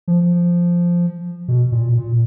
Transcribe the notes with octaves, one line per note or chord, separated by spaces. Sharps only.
F3
B2
A#2
A#2